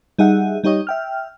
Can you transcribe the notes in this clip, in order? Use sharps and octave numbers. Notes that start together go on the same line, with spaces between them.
G3 D#4 G#4 E5 F#5
G3 D#4 G4 C#5 D#5
E5 G5 F6